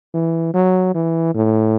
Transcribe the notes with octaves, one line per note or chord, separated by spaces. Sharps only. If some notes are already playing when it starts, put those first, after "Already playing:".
E3
F#3
E3
A2